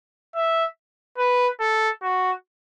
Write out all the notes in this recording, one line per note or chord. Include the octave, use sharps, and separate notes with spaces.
E5
B4
A4
F#4